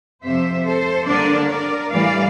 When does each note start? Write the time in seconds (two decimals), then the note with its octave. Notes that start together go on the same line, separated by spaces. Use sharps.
0.23 F2 C3 F3 C5 E5
0.66 A4 C5
1.07 D3 G3 A#3 D4 A#4 D5
1.49 A#4 D5
1.90 A2 E3 G3 D5 F5